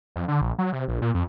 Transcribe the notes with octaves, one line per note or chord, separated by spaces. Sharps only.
F2
D3
A#1
F#3
C3
A#1
A#2
F2